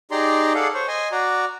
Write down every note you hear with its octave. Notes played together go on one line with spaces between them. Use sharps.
D#4 G4 G#4 D5 A#5 C6
G#4 A4 D5 F5 F#5
C5 C#5
D#5 G#5 C6
F#4 D5 A#5